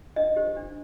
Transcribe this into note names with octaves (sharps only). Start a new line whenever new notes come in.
D4 D#5
G4 C5
D4